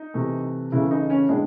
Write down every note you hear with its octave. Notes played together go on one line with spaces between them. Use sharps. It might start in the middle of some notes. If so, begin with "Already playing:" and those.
Already playing: D#4
C3 E3 A3
C#3 E3 A3 E4
D#4
C#4
A2 E3 G#3 D4